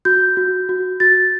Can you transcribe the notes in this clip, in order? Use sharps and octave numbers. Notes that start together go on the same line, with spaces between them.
F#4 G6
F#4
F#4
F#4 A6